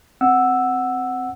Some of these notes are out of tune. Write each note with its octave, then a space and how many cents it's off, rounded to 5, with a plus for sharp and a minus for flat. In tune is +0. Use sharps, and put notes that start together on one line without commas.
C4 -5 F#5 +0 E6 +0